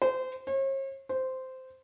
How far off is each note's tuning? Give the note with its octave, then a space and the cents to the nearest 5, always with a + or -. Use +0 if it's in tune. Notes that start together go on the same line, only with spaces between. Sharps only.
C5 -25
C#5 -45
C5 -10